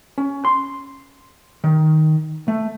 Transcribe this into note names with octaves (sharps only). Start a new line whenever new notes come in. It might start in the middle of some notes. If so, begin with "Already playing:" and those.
C#4
C6
D#3
A3